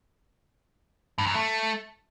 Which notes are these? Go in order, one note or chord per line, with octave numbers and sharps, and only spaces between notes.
G2
F#2
A3